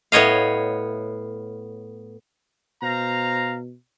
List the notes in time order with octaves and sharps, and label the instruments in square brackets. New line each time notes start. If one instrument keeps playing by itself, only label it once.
[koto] A2 B3 C#5 D#5 F5
[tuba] B2 [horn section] C5 F5 A#5